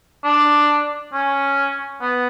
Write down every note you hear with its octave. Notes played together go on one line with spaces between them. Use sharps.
D4
C#4
B3